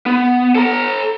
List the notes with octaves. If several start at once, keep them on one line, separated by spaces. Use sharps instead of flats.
B3
A4 A#5